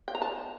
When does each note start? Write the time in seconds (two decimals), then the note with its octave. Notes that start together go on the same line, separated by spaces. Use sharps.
0.08 G5
0.15 A#5
0.22 A5